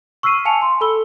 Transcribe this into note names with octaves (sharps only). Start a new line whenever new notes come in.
C#6 E6 F6 B6 C7 D#7
F5 G#5 A5 C#7 F7
C6
A4 B5 E6 G7